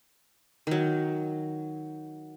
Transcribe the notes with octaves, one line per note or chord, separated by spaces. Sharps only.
D#3 F#3